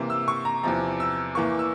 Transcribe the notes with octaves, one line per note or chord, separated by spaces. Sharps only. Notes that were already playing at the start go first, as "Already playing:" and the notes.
Already playing: C3 E3 A#3
E6
C#6
A#5
E2 C3 F3 A#5
E6
E2 E3 A#3 C#6
E6